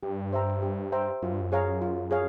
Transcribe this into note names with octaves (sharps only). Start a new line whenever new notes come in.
G2 G4
C5 E5 G5 A#5
G4
C5 E5 G5 A#5
F#2 F4
G2
F#2
G#4 C#5 F5 A#5
F4
G#4 C#5 F5